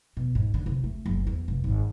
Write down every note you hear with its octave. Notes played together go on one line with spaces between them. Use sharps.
B2
G#2
D3
C2
A3
F#1
E2
F1
G#1